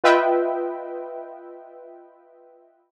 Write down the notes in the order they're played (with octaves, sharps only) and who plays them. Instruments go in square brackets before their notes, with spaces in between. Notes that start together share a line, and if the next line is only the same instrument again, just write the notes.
[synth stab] F4 B4 D#5 E5 G5